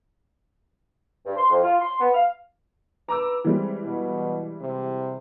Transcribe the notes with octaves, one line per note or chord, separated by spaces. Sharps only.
G2
C6
F2
F4
C6
B3
F5
B4 A#5 D6 E6
E3 G3 G#3 C4
B2
C3